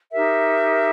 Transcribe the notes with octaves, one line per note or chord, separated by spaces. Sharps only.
D#4 G4 A#4 E5